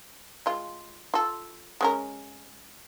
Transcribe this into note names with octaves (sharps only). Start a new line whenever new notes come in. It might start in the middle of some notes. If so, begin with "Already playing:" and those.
G#3 F4
F4 A4
G#3 C#4 A#4